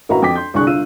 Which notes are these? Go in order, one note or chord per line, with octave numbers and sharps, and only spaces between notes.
A1 A#3 F#4 B4 E5 A#5
F2 G5 D6 B6
C6 G6
C2 D3 D4 G#4 C#6 F#6
G1 F4 E6 D#7